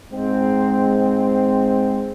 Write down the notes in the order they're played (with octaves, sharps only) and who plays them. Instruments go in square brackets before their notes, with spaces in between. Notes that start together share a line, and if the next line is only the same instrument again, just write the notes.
[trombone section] G#2 G#3 C4